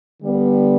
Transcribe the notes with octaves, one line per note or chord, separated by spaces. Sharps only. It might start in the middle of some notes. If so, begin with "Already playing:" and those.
D3 G3 B3